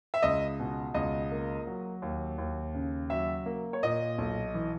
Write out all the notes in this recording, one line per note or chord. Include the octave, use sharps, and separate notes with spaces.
E5
C#2 D#5
B2
C#2 D#5
A#3
F#3
D#2
D#2
C#3
F#3 E5
A#3
C#5
A#2 D#5
B1
E3